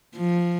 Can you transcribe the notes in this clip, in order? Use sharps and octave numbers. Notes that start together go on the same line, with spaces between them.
F3